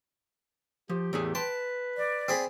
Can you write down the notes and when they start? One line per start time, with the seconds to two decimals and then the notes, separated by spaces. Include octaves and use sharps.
0.89 F3 G4
1.13 E2 A2 G#4
1.35 B4 G5 A5 C6
1.97 D5
2.28 C4 G#4 B5